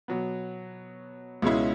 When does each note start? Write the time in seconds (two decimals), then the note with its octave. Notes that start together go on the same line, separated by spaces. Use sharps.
0.08 B2 F#3 B3
1.42 C#2 B2 G#3 C#4 E4